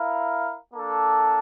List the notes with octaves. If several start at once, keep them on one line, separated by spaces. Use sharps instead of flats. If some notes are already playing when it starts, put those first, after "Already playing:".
Already playing: E4 A#4 F5
A#3 D4 A4